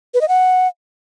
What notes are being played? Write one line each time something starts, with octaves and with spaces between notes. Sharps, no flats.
B4
D#5
F#5